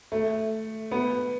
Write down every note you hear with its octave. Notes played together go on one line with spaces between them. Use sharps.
A3
B3